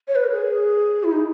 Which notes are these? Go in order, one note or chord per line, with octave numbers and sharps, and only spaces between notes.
C#5
B4
A#4
G#4
E4
D#4